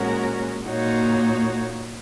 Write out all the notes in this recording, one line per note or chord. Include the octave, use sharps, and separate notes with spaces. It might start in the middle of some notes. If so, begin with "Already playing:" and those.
Already playing: A#2 G#3 C#4 F#4 A#4
A#2 A#3 D#4 F#4 C#5